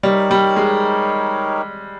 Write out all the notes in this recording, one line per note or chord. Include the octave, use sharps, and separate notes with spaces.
G3 D#4 G4 A#4 C#5
G3
G#3